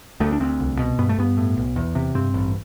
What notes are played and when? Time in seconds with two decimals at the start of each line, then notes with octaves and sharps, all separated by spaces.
0.20 D2 A3
0.33 D4
0.40 D2 C4
0.60 C2
0.79 B2
0.99 G2 B3
1.09 A3
1.18 G2 B3
1.37 A2
1.57 B1
1.76 E2
1.95 C3
2.15 G2 C4
2.34 A1